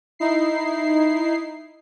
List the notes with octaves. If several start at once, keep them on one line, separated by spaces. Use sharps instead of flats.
D#4 E4 C7